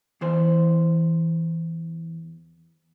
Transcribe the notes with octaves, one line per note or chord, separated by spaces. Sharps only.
E2 E3 C5